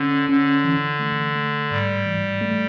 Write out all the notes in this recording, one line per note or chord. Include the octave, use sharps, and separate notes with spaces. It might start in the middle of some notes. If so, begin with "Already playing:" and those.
Already playing: D3 C#4
D3 C#4
E3
A3
A3
G#2 G3
E3
A3